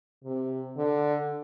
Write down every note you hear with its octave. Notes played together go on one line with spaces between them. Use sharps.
C3
D3